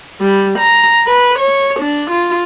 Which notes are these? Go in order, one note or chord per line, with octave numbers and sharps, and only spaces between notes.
G3
A#5
B4
C#5
D4
F4